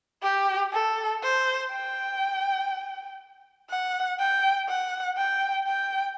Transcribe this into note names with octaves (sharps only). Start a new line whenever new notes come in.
G4
A4
C5
G5
F#5
G5
F#5
G5
G5